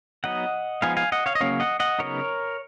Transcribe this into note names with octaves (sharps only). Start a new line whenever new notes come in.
F#3 B3 D#4 D#5 F#5
F3 G#3 B3 D#4 F5 G#5
F5 G#5
D#5 F#5
C#5 F5
D#5
C#3 F#3 A#3 C#4 C#5 F5
D#5 F#5
D#5 F#5
C#3 F#3 B3 D#4 A#4 C#5